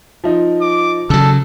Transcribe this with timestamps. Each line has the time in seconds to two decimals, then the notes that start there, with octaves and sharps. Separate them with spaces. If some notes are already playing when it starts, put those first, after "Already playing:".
0.24 F3 D#4
0.61 D6
1.10 C#3 F#3 A4